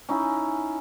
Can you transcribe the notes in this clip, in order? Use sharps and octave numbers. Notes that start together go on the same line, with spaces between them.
C#4 D#4 E4 G#5